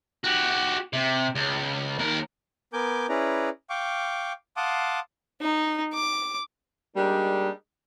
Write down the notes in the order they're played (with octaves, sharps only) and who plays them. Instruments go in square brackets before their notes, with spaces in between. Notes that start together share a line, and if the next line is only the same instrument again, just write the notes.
[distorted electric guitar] F#4 G4
C3
C#2
D#2 A#4
[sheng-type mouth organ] B3 A#4 G#5 D6 G6
C#4 E4 G#4 B4 D5 A#5
F5 G5 C#6 D6
F5 F#5 A5 C6 D6 D#6
[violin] D#4
D6
[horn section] G3 G#3 A#3 D4 D#4